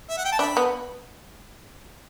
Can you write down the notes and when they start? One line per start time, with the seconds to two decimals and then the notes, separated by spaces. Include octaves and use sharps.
0.09 E5
0.17 F#5
0.24 G5
0.32 A5
0.39 D4 E5 G5 B5
0.57 B3